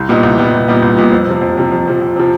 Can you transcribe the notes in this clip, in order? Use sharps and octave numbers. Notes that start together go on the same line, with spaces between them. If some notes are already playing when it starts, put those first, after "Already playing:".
Already playing: C2
A#2 G3 B3 D#4
C2
A#2 G3 B3 D#4
C2
A#2 G3 B3 D#4
C2
A#2 G3 B3 D#4
F2
C3 F3
F2
C3 F3
F2
C3 F3
F2
C3 F3